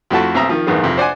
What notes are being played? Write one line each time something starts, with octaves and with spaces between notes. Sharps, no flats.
F2 A3 E4 F#4 E5 A5
B1 C4 E5 A#5 D#6
D#3 F3
A1 E2 G2 D#3 B3 G#4
F2 C3
C5 D5 F#5 G#5